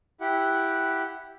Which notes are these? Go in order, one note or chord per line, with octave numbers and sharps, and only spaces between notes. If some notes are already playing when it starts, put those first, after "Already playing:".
E4 G4 F#5